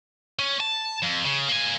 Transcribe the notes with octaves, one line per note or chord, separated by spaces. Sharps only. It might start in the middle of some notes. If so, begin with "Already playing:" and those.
C#4
A5
F2
C#3
A#3 G#5